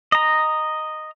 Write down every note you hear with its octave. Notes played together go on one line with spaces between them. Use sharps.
D#5 A#5